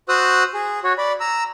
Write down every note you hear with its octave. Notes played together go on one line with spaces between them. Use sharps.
F#4 C5 D#6 E6 F#6
G#4
F#4 C#5
D5 B5
A#5 E6